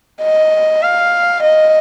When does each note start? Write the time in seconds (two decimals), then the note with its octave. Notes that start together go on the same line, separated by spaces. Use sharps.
0.23 D#5
0.83 F5
1.43 D#5